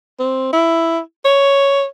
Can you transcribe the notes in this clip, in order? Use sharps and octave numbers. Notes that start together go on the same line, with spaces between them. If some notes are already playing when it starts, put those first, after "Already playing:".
C4
E4
C#5